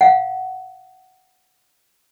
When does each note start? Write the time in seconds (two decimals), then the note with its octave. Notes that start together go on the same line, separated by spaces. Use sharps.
0.01 F5 F#5